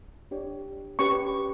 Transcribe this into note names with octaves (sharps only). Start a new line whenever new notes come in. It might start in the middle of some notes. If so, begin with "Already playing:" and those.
D4 G4 C#5
C#4 G4 B4 C#6